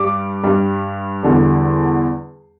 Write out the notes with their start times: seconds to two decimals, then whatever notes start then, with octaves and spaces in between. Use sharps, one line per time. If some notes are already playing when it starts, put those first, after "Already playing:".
Already playing: G2 G3 D6
0.43 G2 G3
1.23 E2 D3 G3